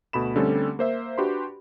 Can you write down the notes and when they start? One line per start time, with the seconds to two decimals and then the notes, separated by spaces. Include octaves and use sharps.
0.13 D2 B2 A3 B5 E7
0.36 D3 G3 A3 C4 C#4 A4
0.79 A#3 C5 E5
1.18 D4 F#4 G4 B4 B5 C6